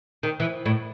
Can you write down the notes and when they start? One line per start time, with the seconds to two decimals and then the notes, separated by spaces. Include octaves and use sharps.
0.23 D#3
0.40 E3
0.65 A2